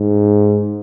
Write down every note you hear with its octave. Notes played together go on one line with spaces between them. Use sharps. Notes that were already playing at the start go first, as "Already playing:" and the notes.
Already playing: G#2